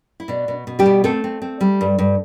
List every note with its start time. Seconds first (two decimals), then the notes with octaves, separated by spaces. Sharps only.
0.20 E4
0.28 B2 D4
0.48 B2
0.67 B2
0.79 G3 G4
0.86 B2
1.04 A3 C4 A4
1.24 C4
1.42 C4
1.61 G3
1.81 G2
1.99 G2